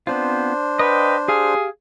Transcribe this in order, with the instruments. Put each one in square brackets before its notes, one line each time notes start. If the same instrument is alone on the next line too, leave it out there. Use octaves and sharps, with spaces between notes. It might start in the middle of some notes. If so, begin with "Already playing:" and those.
[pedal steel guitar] B3 C4 F4 [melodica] D4 C5
[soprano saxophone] B4 [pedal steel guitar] D#5 F5 G5
[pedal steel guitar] G4 F5 F6 [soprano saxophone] G#4